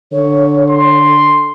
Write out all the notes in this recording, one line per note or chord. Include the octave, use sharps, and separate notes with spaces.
D3 C#5
C6